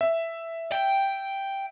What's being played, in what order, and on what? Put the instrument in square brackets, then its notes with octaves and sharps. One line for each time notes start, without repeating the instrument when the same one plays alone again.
[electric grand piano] E5
[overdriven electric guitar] G5